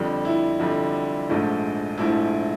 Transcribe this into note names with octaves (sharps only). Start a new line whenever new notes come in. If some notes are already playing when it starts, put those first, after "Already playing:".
Already playing: F2 D3 G3
E4
F2 D3 G3
A#1 G#2 F3 A3
A#1 G#2 F3 A3 E4